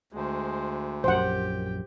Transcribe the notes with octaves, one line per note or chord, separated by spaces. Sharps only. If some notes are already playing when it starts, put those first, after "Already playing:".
D2 G#3 C5
A#1 F#2 G4 C5 F#5 G5